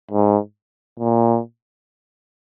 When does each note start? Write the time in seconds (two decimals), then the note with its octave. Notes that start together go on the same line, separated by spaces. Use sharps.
0.11 G#2
1.00 A#2